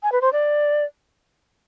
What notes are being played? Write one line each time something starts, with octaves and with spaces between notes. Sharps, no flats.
G#5
B4
C5
D5